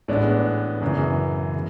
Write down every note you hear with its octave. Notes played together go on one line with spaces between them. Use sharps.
A1 A2 G#3 B3 D4
F#2 C#3 E3
C#3